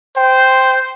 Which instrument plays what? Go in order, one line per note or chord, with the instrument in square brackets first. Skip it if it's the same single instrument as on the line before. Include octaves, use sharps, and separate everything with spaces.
[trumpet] C5 [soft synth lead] G5